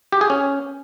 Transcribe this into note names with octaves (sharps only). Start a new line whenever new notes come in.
G4
G#4
C#4